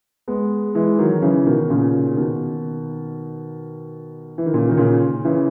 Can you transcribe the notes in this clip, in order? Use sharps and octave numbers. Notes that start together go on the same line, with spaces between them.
G#3 B3
E3 G#3
D#3 F#3
F#3
C#3 E3
B2 D#3
A#2 C#3
B2 D#3
E3
D#3
A#2 C#3
D#3
A#2 C#3
C#3 E3